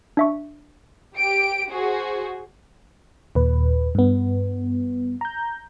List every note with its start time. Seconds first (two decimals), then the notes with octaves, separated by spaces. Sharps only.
0.17 D4 E5 C#6
1.17 G4 D7
1.70 F#4 G#4 C5
3.35 D#2 A#2 B4
3.95 G2 B3
5.21 A#5 G6